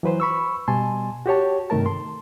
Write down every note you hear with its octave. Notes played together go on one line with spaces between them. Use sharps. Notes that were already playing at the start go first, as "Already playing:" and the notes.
E3 F#3 B4 C5
B5 C#6 E6
B2 G3 G#5 A5 C6
F#4 G4 C#5 A5
G2 C3 D#3 A3 A#4 A5
C6